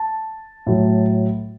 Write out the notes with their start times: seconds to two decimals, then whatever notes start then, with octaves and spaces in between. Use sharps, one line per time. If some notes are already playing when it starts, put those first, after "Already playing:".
Already playing: A5
0.66 A2 F#3